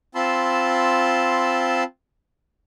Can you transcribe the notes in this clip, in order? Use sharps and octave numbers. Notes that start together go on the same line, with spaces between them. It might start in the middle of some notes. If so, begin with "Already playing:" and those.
C4 F4 A5 B5 C6 E6